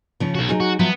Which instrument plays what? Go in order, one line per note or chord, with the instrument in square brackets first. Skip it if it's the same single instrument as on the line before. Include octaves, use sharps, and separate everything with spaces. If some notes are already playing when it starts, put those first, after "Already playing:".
[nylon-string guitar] C#3 F3 C#4
[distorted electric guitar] B1 F#4
[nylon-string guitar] F#3 D#4 G#4
[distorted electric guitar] F#4
[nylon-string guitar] F3 F#3 E5 [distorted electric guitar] B3